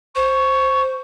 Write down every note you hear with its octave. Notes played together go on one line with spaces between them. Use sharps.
C5 C#6